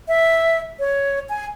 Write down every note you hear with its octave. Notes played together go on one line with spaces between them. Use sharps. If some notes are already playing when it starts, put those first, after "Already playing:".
E5
C#5
G#5